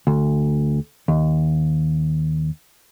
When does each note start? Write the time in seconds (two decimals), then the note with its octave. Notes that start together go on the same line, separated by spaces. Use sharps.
0.07 D2
1.08 D#2